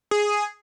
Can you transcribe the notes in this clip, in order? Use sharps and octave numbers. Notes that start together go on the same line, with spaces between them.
G#4